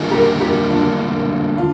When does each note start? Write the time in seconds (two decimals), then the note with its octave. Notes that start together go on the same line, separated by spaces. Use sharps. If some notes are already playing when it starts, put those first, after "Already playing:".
Already playing: D3 G3 A#3 D#4 F4 G#4
0.11 G4 A#4
0.40 G4 A#4
0.70 D4 F4
1.58 D4 F4